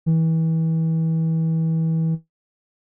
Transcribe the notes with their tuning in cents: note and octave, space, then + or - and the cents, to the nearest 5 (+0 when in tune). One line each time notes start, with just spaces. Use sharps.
E3 -30